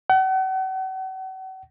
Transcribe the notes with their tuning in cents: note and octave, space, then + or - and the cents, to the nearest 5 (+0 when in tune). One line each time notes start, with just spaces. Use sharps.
F#5 +40